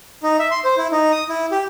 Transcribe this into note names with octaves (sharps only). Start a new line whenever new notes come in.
D#4
E5
C6
C5
E4
D#4
D#6
E4
G4